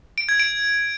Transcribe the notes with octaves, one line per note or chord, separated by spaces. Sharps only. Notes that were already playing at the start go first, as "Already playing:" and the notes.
D7
G#6
D7